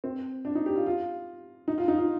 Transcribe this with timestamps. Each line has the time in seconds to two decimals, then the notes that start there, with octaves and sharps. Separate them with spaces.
0.04 C4
0.45 D4
0.55 D#4
0.66 G4
0.76 F4
0.86 F4
1.68 D#4
1.78 F4
1.88 D#4
1.98 F4